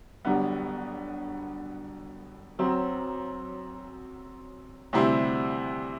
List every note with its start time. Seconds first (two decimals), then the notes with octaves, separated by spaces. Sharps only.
0.25 G1 F#2 D3 G3 B3
2.59 F#2 F#3 C4
4.93 D2 C3 G3 C4 E4